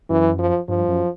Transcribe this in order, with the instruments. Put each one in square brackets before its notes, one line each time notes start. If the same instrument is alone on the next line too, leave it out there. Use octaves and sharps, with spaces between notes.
[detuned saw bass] F#2 [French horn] E3
[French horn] F3
[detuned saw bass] G2 [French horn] F3
[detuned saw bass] F#2